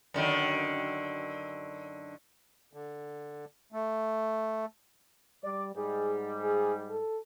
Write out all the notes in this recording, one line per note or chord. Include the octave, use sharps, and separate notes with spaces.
F#2 D3 D#3
D3
A3
G3 D5
G#2 G3 G#4
G#4
A4